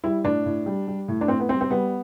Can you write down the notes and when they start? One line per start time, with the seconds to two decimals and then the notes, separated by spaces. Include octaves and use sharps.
0.04 G3 E4
0.24 A2 D4
0.46 A2
0.66 G3
0.88 G3
1.08 A2
1.21 D4
1.28 A2 C4
1.40 B3
1.49 G3 C4
1.61 C4
1.70 G3 B3